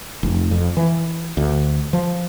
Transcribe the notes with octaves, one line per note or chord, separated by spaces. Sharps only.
F1
F2
E3
D2
F3